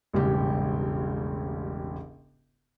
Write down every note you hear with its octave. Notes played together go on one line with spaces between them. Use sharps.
E1 A1 G#2 C#3 G3 G4